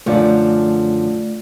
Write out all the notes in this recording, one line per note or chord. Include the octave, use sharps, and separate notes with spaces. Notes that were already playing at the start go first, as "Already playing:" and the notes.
F#2 D3 F3 A3 F4 D5